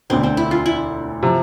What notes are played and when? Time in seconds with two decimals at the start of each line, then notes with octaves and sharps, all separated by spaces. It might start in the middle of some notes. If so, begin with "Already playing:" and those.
0.10 E1 D2 D3 C4
0.23 C4
0.37 E4
0.51 F4
0.66 E4
1.23 C3 F3